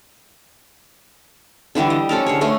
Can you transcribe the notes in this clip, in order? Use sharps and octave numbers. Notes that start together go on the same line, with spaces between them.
D3 E3 G3 G4
D#5
F3 C#4 A4 A#4
D3 G#4 C#5
A3 C5 C#5 G#5